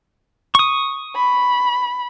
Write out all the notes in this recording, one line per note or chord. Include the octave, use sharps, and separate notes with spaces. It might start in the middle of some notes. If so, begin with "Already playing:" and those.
C#6 D#6
B5